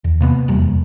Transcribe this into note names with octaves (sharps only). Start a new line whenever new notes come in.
E2
C3 A#3 B3
F1 E2 G3 A#3